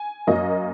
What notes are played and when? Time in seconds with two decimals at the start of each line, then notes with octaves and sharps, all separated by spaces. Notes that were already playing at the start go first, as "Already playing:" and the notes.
Already playing: G#5
0.27 F#2 F#3 A#3 D#5